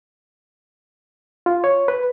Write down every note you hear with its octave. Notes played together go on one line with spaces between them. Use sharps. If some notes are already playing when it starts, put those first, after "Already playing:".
F4
C#5
B4